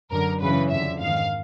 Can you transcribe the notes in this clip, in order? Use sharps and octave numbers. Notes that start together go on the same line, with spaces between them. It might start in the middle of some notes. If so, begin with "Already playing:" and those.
F#2 D3 A#4
F#2 C#3 E3 B4
F2 D3 E5
G#2 D#3 F5